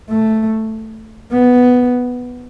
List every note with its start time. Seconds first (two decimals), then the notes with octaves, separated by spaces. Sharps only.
0.10 A3
1.32 B3